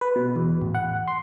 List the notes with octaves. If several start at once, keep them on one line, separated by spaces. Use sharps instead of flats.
B4
B2
E2
A1
F#5
C6